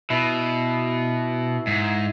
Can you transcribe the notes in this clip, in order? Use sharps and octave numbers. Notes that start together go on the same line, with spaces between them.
B2 E4
G#2